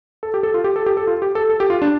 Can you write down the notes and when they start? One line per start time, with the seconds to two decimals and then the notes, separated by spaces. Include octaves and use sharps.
0.23 A4
0.34 G4
0.43 A4
0.54 F4
0.64 G4
0.76 A4
0.86 G4
0.97 A4
1.07 F4
1.22 G4
1.35 A4
1.49 A4
1.60 G4
1.70 F4
1.82 D4